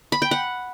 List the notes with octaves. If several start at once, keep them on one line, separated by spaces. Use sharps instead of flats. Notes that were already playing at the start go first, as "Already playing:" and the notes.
B5
G5
F#5